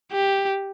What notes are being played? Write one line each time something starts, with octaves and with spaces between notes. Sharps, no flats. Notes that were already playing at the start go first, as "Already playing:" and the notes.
G4